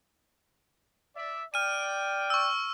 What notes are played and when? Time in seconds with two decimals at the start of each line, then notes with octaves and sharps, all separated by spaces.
1.16 D5 E5
1.54 D5 G5 F6 D#7
2.30 C#6 E6